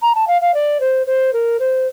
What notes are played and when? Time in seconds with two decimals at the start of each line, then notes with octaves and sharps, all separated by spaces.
0.02 A#5
0.15 A5
0.27 F5
0.41 F5
0.54 D5
0.80 C5
1.06 C5
1.33 A#4
1.59 C5